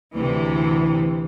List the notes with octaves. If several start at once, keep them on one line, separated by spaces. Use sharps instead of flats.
D2 C3 E3